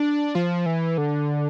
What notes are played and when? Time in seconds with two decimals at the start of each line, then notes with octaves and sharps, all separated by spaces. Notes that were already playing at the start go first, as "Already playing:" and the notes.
Already playing: D4
0.35 F3
0.66 E3
0.98 D3